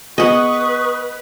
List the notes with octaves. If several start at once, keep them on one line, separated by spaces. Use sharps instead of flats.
B3 G#4 B4 D#5 F#5 C#6 D#6